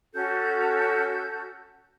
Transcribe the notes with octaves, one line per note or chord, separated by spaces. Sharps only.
C#4 F#4 A4 G6